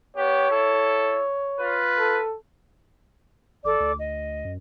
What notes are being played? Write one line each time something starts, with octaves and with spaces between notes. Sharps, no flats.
B3 G4 C#5
E4 A4
F4 B4
A4
G#1 A4 D5 D6
D2
D#5
F#2